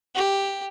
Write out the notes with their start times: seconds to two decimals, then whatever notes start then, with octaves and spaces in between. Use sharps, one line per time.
0.15 G4